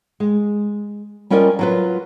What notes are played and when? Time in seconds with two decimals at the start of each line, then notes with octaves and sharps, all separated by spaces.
0.20 G#3
1.30 G3 C#4 F4 A#4 D5 D#5
1.59 F#3 F4 B4